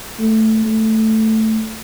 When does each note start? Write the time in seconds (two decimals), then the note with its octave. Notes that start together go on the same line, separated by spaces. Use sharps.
0.19 A3
0.66 A3